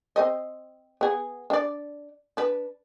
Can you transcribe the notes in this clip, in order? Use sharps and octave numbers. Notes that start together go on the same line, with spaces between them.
C4 C5 D#5
B3 G#4
D4 D5
D4 B4